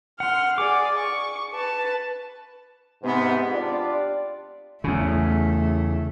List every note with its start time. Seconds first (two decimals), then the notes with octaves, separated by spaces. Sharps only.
0.20 F#5 C6 F6
0.58 G#4 D5 D6
0.98 C#6
1.53 B4 A5
3.02 G#2 C3 B3
3.51 D4 F4 G4 D5
4.84 E2 C#3 A3